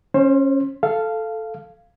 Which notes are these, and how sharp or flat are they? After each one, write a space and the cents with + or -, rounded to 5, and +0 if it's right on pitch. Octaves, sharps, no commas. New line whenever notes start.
C#4 -15 C5 +25
A4 +0 F5 -15